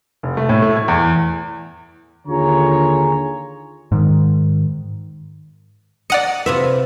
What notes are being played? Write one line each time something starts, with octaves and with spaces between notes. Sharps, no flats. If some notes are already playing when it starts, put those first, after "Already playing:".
F1
A3
A2
A3
G#6
E2
D#2 D3 F4 G#4 C#5 A#5
G#2 D#3
D5 D#5 F#5 A#5 C#7
C3 F4 B4 E5